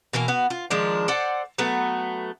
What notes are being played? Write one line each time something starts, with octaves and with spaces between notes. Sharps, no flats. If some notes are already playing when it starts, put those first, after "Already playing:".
B2 E3 A#3 A#4
B3 F#4
F4
D#3 F3 G#3 D4
A4 C5 D5 F#5
F#3 A3 B3